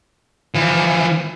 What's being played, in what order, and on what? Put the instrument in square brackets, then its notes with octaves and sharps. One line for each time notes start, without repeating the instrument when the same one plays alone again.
[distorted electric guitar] E3 F3